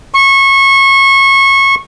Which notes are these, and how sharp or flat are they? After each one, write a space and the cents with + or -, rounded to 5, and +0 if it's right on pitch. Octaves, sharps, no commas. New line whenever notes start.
C#6 -25